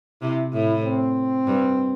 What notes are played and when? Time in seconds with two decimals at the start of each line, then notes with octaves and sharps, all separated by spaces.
0.21 C3 E4
0.53 A2 E4
0.84 C4
1.47 G2